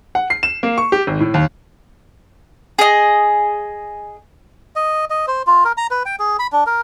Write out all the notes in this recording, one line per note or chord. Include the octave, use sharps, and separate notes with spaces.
F#5
C7
E7
A#3
C#6
G4
G#1
A2
D#2
G#4 D#5
D#5
D#5
C5
F4
A#4
A#5
B4
G5
G#4
B5
D4
A#4